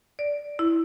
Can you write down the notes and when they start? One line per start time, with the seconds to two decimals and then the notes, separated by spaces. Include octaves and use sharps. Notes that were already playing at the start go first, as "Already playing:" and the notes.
0.19 D5
0.59 E4